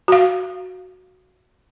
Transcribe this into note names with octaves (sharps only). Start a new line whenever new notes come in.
F#4 F5